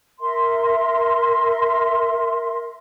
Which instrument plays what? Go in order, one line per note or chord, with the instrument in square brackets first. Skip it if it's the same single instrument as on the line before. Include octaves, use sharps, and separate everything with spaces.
[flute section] A#4 E5 C6